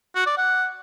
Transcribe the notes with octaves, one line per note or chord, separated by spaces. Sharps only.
F#4
D5
F#5